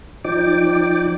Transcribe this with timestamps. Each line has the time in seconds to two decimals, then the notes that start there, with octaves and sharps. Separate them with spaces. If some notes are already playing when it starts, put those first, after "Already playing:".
0.24 F3 D#4 D5 G5 D6